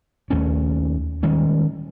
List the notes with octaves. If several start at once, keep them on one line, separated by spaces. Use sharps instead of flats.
D#2 A3 C#4
D#3 G3 G#3 C#4